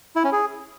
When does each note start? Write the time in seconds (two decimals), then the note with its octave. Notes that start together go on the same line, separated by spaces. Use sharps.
0.16 E4
0.24 C#4
0.33 G#4